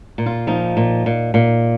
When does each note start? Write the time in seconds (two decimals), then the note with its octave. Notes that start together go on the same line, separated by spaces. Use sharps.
0.18 A#2
0.26 F4
0.47 F3 D#4
0.77 A#2
1.06 A#2
1.34 A#2